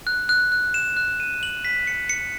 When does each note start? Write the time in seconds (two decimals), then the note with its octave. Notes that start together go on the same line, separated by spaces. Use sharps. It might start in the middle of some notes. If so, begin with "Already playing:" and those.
0.07 F#6
0.29 F#6
0.52 F#6
0.74 E7
0.97 F#6
1.20 D#7
1.43 F#7
1.65 B6
1.87 C#7
2.09 C#7